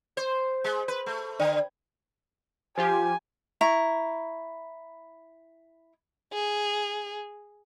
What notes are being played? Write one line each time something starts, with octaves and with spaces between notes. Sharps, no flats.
C5
G#3
B4
A3
D3
F3 F4 G4 G#5
E4 A#5 C#6
G#4